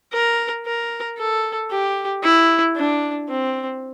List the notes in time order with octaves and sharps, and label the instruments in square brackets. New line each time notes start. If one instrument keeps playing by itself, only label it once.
[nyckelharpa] A#4
A#4
A4
G4
E4
D4
C4